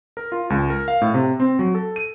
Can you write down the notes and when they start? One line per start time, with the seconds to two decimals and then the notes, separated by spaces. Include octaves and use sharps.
0.17 A#4
0.32 F4
0.50 C#2
0.70 A#4
0.88 F5
1.01 A2
1.14 C3
1.40 C4
1.59 F#3
1.75 A4
1.96 D#7